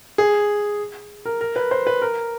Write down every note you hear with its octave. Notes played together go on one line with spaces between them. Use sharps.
G#4
A#4
A#4
B4
C5
B4
A#4